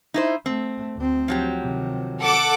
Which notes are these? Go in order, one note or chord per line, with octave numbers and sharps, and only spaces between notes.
D#4 E4 C5
A3 C4
D2 C4
F3 F#3 G4
C3 D#3
A4 F#5 D6